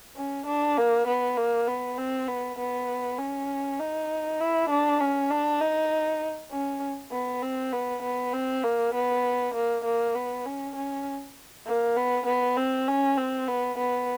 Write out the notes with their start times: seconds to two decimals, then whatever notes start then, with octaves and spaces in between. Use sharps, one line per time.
0.16 C#4
0.46 D4
0.77 A#3
1.07 B3
1.37 A#3
1.68 B3
1.98 C4
2.28 B3
2.59 B3
3.19 C#4
3.80 D#4
4.40 E4
4.70 D4
5.01 C#4
5.30 D4
5.60 D#4
6.52 C#4
7.12 B3
7.43 C4
7.72 B3
8.03 B3
8.33 C4
8.64 A#3
8.94 B3
9.54 A#3
9.85 A#3
10.15 B3
10.46 C#4
10.76 C#4
11.67 A#3
11.97 B3
12.26 B3
12.57 C4
12.88 C#4
13.17 C4
13.48 B3
13.78 B3